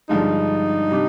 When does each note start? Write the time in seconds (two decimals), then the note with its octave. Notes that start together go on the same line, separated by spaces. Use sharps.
0.09 G2 D3 F3 G#3 D#4
0.91 C3 G3 D4